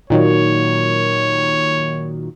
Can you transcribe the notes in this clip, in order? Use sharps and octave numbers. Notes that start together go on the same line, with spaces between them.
A#2 D#3 F#3 C#5